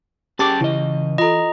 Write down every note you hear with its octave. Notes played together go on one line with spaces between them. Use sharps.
C#4 G4 G#4 A5 D6
C#3 E3 D#5
F4 A4 D#5 A#5